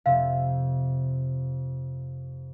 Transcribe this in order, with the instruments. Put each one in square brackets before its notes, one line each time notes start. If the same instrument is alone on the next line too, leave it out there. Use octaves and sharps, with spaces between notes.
[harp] F2 C3 [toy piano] F5